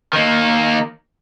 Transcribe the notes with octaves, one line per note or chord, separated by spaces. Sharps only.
D#3 A#3